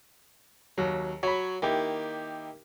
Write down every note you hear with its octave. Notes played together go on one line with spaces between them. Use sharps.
D#2 F#3
F#3 C#5 B5
D#3 A#3 E4 G4